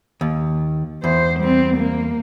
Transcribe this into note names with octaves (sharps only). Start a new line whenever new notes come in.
D#2
E2 C5
G3 C4
A#3